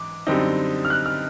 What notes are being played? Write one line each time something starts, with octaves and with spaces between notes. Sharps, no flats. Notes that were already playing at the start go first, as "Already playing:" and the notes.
Already playing: G#2 E3 D6
F#2 D3 G3 C4 D#4
F6
F#6
F6